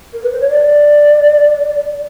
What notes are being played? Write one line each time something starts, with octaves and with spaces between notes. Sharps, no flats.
A#4
B4
C5
C#5
D5